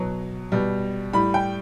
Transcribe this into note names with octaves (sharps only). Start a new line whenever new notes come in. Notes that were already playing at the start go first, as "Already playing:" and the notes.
Already playing: B2 F#3
B2 G3
A2 G3 B5
G5